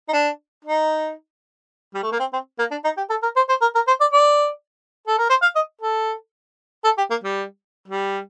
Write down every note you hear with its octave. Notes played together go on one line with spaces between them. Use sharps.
D#4
D4
D#4
G3
A3
A#3
C4
C4
A#3
D4
D#4
G4
A4
A#4
C5
C5
A#4
A#4
C5
D5
D5
A4
A#4
C5
F5
D#5
A4
A4
G4
A#3
G3
G3